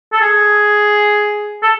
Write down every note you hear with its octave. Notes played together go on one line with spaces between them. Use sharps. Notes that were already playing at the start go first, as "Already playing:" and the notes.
A4
G#4
A4